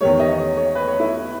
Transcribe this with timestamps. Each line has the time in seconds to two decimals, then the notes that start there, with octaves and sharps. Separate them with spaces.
0.01 E2 D#3 G3 C#5
0.20 D#5
0.38 C#5
0.57 C#5
0.75 B4
0.87 C#5
1.00 E4